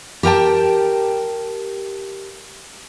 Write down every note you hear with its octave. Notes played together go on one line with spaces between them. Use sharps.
G4 A#4 G5 A5